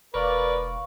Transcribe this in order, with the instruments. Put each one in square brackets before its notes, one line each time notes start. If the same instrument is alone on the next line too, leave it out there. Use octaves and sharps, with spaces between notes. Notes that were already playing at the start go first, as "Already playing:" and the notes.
[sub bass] E1 [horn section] A#4 D5 [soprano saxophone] B4 [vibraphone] F5 C#6